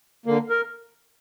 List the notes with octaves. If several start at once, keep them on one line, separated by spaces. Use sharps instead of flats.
D3 A#3
A#4